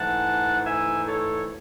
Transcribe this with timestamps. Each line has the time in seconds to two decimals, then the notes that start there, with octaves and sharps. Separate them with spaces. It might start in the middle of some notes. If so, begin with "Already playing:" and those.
Already playing: G#2 E3 A3 F#5 A5
0.65 E5 G#5
1.07 A4 C#5